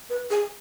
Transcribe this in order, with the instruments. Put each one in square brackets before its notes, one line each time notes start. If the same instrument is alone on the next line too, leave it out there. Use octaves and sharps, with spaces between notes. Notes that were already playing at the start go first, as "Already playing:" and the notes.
[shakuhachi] B4
G#4